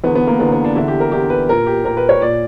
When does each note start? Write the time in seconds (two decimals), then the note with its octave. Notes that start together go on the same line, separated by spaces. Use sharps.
0.04 E2 D3 B3
0.15 B3
0.27 A#3
0.39 E2 D3 B3
0.52 B3
0.64 D4
0.76 E2 D3 E4
0.88 G4
1.00 A#4
1.12 E2 D3 G4
1.30 B4
1.49 A#2 A#4
1.66 G4
1.84 A#2 A#4
1.97 B4
2.09 C#5
2.21 A#2 D5